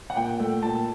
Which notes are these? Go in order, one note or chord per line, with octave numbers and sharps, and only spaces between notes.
F#5
A#2 G5
A3
A#2 A5